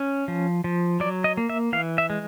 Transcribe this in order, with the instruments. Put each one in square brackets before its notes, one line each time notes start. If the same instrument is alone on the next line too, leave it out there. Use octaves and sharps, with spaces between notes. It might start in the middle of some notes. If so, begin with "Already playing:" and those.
Already playing: [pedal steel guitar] C#4
F3
F3
F#3 D5
D#5
A#3
E5
E3 F5
E5
G#3